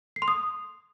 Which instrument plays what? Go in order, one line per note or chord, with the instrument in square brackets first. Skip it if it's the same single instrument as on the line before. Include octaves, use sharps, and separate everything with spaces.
[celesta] C7
C6
D#6